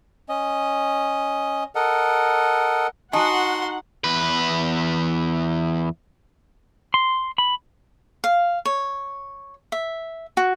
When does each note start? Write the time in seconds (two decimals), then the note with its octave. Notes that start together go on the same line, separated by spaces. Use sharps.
0.29 C#4 D#5
1.75 A4 A#4 D#5 F#5
3.13 D#4 F#4 F#5 G#5 A5 C6
4.04 E2 B4
6.94 C6
7.38 B5
8.24 F5
8.65 C#5
9.72 E5
10.37 F#4